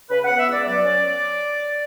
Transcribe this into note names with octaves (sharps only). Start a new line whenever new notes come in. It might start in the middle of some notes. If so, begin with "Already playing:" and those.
C#3 B4
F#5
B3
E5
C#2 D5
F#3 D5
C#4